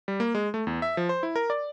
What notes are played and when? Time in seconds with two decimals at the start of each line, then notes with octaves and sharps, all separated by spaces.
0.08 G3
0.20 A#3
0.35 G#3
0.54 A3
0.67 E2
0.82 E5
0.97 F3
1.09 C5
1.23 E4
1.36 A#4
1.50 D5